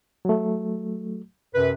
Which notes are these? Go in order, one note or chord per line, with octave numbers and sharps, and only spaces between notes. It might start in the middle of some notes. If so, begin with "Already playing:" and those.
F#3 A3
F#2 C3 B4